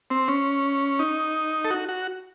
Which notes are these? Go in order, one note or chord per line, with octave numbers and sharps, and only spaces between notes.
C4
C#4
D#4
A4
F#4
F#4